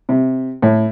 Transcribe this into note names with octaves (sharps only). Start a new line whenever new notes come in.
C3
A2